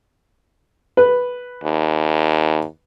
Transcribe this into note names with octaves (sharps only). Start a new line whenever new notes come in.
B4
D#2